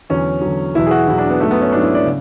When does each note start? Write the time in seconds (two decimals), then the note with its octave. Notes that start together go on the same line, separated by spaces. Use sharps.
0.10 E2 D3 F#3 C#4
0.42 E2 D3 F#3
0.75 E2 B2 F#3 E4
0.87 G#4
0.91 F#4
1.07 E2 B2 F#3 E4
1.18 D4
1.29 B3
1.39 G#2 F#3 A3
1.51 B3
1.62 C#4
1.72 G#2 F#3 D4
1.83 E4
1.95 D5
2.05 C#3